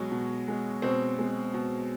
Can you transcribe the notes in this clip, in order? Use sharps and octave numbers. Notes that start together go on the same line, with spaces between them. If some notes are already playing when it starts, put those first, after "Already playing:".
Already playing: B2 F#3 G#3 F#4
B2
G#3
B2 C4 C5
G#3
B2